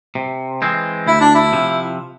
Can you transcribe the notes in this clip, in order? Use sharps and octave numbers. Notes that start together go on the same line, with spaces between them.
C3
E3 G#3 C4
D2 E4
D4
E4
C3 F3